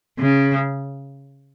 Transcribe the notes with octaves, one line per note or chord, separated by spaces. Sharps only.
C#3